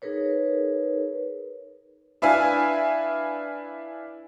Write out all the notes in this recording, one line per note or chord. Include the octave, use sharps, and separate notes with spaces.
D#4 G#4 A#4 B4 C#5
D4 E4 B4 E5 F5 G#5